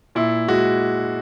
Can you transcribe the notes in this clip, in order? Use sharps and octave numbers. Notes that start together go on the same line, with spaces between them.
A#2 E4
G#3 F#4